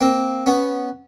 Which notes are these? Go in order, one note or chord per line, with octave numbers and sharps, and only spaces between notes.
A#3 C4
B3 C#4